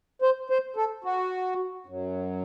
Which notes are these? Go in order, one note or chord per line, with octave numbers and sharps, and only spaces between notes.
C5
C5
A4
F#4
F#2 F#3